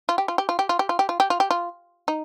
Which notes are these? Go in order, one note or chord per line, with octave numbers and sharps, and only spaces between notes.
F4
G4
F4
G4
F4
G4
F4
G4
F4
G4
F4
G4
F4
G4
F4
D#4